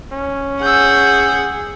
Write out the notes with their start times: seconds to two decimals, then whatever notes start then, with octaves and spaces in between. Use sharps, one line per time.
0.12 C#4
0.62 G#4 F#5 E6 G6